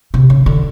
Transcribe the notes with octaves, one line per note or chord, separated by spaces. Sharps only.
C3
C#3
D3